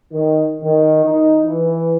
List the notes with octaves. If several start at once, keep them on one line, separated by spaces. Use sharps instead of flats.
D#3
D#3
D#4
E3